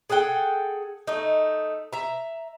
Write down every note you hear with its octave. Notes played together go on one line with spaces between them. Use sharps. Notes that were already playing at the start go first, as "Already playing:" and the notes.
G#4 A4 F#5 G5
A3 D#4
E5 A#5